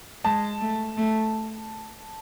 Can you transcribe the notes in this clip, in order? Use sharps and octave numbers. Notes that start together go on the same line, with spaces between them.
G#3 A5
A3
A3